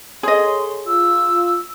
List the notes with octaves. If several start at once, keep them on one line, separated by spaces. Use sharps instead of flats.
G#4 A4 C#5 D#5 C6
F4 E6